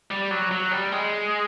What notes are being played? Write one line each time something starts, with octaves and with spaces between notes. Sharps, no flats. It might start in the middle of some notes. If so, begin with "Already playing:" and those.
G3
F#3
F#3
G3
G#3